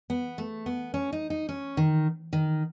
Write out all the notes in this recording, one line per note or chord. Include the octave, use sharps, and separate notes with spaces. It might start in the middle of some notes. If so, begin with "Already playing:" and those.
B3
A3
B3
C#4
D#4
D#4
C#4
D#3
D#3